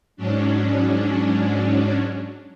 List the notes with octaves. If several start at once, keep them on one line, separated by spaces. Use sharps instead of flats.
G#2 F#3 C#4 D4